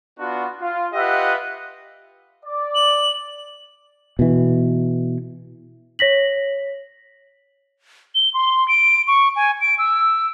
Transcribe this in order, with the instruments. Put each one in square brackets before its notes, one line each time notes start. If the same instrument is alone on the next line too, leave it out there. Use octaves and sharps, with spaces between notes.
[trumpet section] B3 D4 F4 F#4
F4
F4 G4 B4 D#5 E5 F#5
D5
[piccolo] F#7
[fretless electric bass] B2 E3
[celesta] C#5 A#6 B6 F#7
[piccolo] G7
C6
D7
C#6
G#5
D7
E6